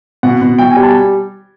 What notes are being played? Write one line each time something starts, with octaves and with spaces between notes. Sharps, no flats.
B2 F#5
B2
B2 G5
G#5
G3
A5